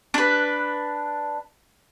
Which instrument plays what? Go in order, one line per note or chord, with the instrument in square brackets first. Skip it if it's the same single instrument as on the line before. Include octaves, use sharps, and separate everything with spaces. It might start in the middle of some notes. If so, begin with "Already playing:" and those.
[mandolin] D4 B4